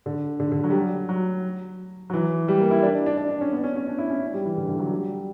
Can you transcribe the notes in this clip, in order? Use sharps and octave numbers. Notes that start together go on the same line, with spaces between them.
D3
D3
D3
F#3
G3
F#3
F#3
F#3
E3
G3
A#3
E4
D4
D4
D4
D4
D4
C#4
B3
C#4
C#4
D4
E4
C#4
G3
E3
D3
D3
F#3
G3